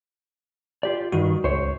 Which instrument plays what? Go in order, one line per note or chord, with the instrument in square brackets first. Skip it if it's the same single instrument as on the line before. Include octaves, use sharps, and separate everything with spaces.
[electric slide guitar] F4 G4 D5
[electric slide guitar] G2 D#3 [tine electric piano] F#4
[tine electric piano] C#2 [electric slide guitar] C5 C#5